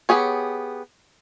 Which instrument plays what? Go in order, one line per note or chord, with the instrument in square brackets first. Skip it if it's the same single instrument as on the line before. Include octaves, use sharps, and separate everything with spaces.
[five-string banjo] B3 G4 G#4 C#5